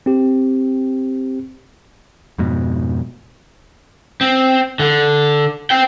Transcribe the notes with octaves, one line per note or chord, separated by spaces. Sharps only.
C4 G4
F2 G#2 B2
C4
D3
C5 G5